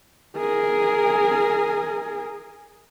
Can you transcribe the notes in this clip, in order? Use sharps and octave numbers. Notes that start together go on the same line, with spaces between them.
G#4 A#4